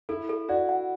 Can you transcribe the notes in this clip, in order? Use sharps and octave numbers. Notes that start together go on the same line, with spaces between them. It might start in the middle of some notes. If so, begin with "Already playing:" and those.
E4 A4
A4
F#4 D5
F#5